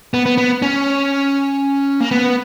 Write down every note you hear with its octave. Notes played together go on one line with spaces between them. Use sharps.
B3
B3
B3
C#4
A#3
B3